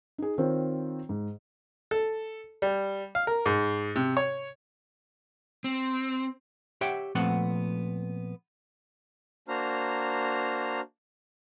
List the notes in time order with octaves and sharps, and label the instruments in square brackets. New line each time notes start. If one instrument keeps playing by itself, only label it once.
[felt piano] D#4 G#4
D#3 C4 F4 C5 C#5
G#2
[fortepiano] A4
G3
F5
A#4
G#2
C3
C#5
[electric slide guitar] C4
[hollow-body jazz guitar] G4 C#5 E5 F#5 G5
A#2 F3 A3 B3 C4 F#5
[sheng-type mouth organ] A#3 D4 F#4 C5 A#5 F6